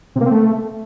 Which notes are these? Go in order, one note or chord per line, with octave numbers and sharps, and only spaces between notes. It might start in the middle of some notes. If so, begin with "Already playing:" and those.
C3
A#3
C4
A3